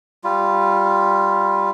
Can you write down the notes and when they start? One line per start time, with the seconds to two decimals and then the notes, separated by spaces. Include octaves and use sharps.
0.24 G3 F4